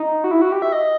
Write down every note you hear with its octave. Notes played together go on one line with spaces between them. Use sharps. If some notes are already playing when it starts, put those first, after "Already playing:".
Already playing: D#4
F#4
E4
F#4
G4
E5
D#5